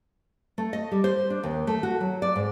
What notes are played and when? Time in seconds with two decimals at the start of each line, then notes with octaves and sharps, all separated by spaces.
0.58 A3
0.73 D#5
0.91 G3
1.04 C5
1.30 D4
1.43 D#2
1.67 A3
1.83 F#4
2.01 F#3
2.22 D5
2.36 G#2